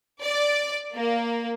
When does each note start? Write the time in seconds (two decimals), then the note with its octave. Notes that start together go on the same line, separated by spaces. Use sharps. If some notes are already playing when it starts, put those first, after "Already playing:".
0.24 D5
0.96 A#3